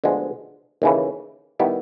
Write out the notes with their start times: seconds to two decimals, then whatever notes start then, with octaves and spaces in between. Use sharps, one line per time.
0.04 D2 D3 F3 G#3 B3
0.82 D#2 C#3 E3
1.59 D#3 G3 B3 E4 G4